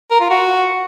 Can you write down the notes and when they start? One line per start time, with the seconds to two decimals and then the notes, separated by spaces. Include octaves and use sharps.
0.11 A#4
0.21 F4
0.30 F#4